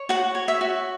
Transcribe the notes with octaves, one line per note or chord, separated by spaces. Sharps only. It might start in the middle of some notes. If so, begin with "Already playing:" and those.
Already playing: C#5
F#4 F#5
C#5
E5
F#4